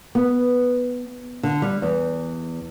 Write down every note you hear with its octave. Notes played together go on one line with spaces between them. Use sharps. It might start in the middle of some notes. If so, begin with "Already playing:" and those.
B3
D3
G3
E2